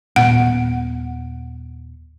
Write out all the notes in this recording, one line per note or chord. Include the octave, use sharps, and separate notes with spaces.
D#1 A#2 B3 F#5